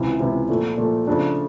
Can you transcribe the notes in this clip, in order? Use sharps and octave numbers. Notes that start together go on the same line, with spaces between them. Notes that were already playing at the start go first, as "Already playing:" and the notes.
Already playing: C#2 C3 E3
C#2 C3 E3
A#2 F3 A3
A#2 F3 A3
C#3 F3 A3 D4